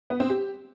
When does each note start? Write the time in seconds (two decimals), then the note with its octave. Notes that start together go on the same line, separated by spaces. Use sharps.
0.10 B3
0.20 C4
0.30 G4